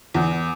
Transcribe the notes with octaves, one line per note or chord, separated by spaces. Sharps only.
E2